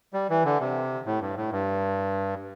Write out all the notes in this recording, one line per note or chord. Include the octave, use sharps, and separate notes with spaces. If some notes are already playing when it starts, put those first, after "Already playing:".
G3
E3
D3
C3
A2
G2
A2
G2